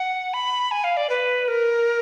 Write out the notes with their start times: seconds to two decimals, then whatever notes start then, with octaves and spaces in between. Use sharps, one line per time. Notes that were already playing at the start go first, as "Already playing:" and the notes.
Already playing: F#5
0.34 B5
0.71 G#5
0.84 F5
0.97 D5
1.10 B4
1.48 A#4